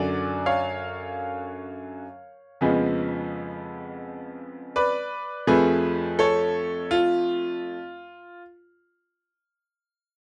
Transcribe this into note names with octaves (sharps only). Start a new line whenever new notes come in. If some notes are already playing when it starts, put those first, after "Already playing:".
Already playing: F#2 D3 F#3 D5
C#5 F5
F2 C#3 F3 G#3 B3
B4 D5
F2 F3 A3 G#4 B4
A4 C#5
F4